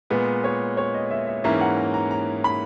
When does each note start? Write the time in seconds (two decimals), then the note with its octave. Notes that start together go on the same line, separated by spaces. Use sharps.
0.10 A#2 G#3 B3 B4
0.44 C#5
0.77 C#5
0.94 D#5
1.11 E5
1.27 E5
1.44 G#2 E3 A#3 C#4 E5
1.61 F#5
1.77 A#5
1.94 A#5
2.11 A#5
2.44 B5